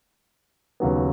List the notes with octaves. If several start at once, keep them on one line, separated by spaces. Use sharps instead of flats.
D#2 C#3 F#3 B3